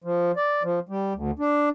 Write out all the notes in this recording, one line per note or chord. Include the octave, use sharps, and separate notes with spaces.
F3
D5
F3
G3
D2
D4